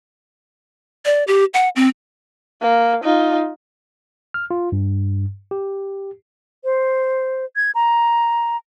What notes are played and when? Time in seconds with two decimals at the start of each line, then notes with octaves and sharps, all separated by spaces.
1.05 D5
1.27 G4
1.54 F#5
1.76 C4
2.61 A#3
3.03 D#4 F4
4.34 F6
4.51 F4
4.72 G2
5.51 G4
6.64 C5
7.56 G#6
7.75 A#5